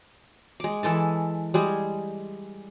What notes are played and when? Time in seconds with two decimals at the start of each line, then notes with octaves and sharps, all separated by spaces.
0.60 G#3 D6
0.83 E3 G#3 A4 A5
1.54 G3 G#3 G#4